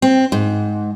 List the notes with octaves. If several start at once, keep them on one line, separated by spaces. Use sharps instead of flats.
C4
G#2